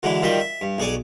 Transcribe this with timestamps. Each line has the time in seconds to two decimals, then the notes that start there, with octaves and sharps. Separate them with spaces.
0.03 D3 E3 F#3 G#3 E4
0.22 D#3 F3 G3 D#5 E5
0.40 E5
0.61 G2
0.78 B1 G#4 C#5 D5 G#5